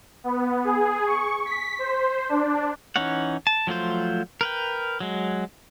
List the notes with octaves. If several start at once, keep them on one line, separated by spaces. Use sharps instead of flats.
B3
G#4
C#6
B6
C5
D4
E3 C#4 D#4 C#5 F#5
A5
F3 F#3 A3 F4 C5
A#4 B4 G5
F#3 G#3